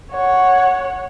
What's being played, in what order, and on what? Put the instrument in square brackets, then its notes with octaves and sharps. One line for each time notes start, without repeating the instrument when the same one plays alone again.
[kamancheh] C#5 F#5